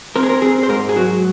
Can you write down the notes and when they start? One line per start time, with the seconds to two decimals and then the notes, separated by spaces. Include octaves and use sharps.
0.16 C4 A#4
0.23 G#4
0.29 A#4
0.42 C4 G#4
0.63 C5
0.69 G#2 A#4
0.89 G#4
0.96 F#3 F#4